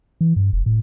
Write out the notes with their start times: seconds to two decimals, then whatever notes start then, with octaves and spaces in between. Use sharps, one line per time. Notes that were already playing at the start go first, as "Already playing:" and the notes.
0.21 E3
0.36 G2
0.53 F1
0.66 A2